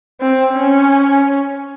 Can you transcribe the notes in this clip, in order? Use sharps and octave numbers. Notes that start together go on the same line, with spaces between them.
C4
C#4